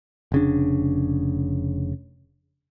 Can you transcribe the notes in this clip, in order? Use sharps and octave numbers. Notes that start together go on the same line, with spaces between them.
F1 C#3 D4